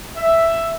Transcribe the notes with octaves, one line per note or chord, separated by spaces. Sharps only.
E5